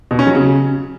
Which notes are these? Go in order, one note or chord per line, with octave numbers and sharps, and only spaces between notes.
B2
C#4
F#3
C#3